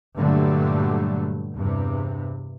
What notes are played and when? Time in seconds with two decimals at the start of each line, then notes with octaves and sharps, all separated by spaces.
0.16 G2 A#2 D3 F#3 G3 A3
1.56 E2 G2 C3